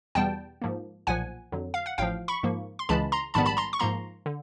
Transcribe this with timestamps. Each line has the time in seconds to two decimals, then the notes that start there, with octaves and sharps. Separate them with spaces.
0.15 E2 B2 G3 B3 G5 A5
0.62 G#2 F3 A#3
1.07 B1 A#2 F3 F#5 G#5
1.52 F2 D3 F#3
1.74 F5
1.86 F#5
1.98 A1 A2 F3 F5 G5
2.28 B5 C#6
2.43 G#2 F3 A#3
2.79 C6
2.89 C#2 C#3 E3 G#3 A5 B5
3.12 A#5 C6
3.34 A#1 G#2 D#3 G3 B3 A5 B5
3.46 A5 B5
3.57 A#5 C6
3.73 C#6
3.79 G#2 F3 A#3 A#5 C6
4.26 D3